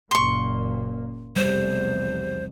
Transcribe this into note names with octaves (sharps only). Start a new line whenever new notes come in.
F#1 A#2 A#3 C6 C#6
F1 B1 E2 G3 C5